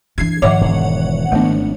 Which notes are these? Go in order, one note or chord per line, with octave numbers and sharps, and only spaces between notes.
E3 D4 G#6 C7
G#2 D#3 F3 C#5 E5 F#5 D6
E1
G#1 F3 A3 B3 D4